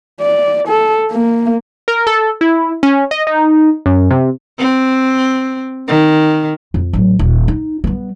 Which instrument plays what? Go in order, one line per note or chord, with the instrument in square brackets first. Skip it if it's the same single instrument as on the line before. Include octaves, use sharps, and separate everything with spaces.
[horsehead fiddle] D5
A4
A#3
[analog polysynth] A#4
A4
E4
C#4
D#5
D#4
F#2
C3
[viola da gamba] C4
D#3
[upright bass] F2
A1 F#3
D#1
D#4
G3 B3